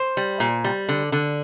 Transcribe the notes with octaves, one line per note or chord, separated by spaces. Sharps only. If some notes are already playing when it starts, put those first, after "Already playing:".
Already playing: C5
G3
A#2
G3
D3
D3